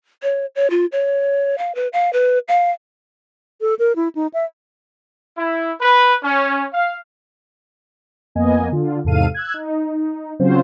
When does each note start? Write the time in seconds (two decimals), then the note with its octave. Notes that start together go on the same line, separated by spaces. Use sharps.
0.23 C#5
0.56 C#5
0.70 F4
0.92 C#5
1.58 F5
1.75 B4
1.93 F5
2.13 B4
2.48 F5
3.61 A4
3.79 A#4
3.96 E4
4.15 D#4
4.34 E5
5.36 E4
5.80 B4
6.23 C#4
6.73 F5
8.35 F2 A#3 B3 D#5 G#5
8.71 D3 F4
9.04 E2 G#2 C3 A4 F5 D#7
9.34 E6 F#6 G#6
9.54 D#4
10.40 C#3 F#3 C4 C#4 F4 C5